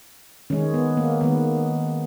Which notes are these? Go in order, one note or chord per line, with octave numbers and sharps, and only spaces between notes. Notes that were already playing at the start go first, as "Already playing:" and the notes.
D#3 G#3 C#4
B3
A#3
D#3 G#3 B3